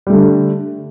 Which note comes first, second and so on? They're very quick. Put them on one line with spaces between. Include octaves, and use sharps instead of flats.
G3 A3 D3